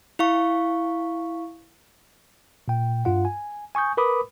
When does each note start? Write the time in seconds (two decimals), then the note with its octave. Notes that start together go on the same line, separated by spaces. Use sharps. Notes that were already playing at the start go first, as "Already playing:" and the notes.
0.19 E4 F5 C#6
2.68 A#2 G5
3.05 G2 F4 F#5
3.25 G#5
3.75 G#5 C#6 D#6 G6
3.97 A#4 B4 B5 D6 D#6